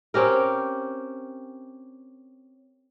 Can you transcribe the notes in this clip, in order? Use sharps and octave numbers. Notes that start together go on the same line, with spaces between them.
C4 C#4 G4 A#4